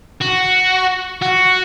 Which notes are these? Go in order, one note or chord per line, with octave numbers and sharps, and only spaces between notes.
F#4
F#4